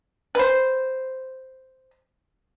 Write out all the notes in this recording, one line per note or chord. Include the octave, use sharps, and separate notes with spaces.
B4 C5